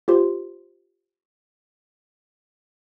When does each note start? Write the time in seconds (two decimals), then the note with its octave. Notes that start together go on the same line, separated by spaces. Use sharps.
0.08 F4 G4 C5 C6